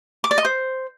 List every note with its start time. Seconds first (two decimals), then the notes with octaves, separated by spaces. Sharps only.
0.24 D6
0.31 D5
0.38 D#5
0.45 C5